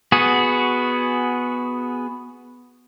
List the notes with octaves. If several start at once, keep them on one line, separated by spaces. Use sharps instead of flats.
B3 F#4 G#4